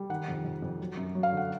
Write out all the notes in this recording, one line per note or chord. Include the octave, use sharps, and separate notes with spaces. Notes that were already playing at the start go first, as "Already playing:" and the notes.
Already playing: G3
D#3 F#5
F2
F2
F2
F#3
F#2
F#3
F5
D3 F#5